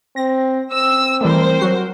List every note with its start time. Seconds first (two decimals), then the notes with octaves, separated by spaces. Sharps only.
0.16 C4 A#6
0.71 C4 E6
1.21 E3 G3 A3 A#4 C5
1.60 F#3 F#4 C7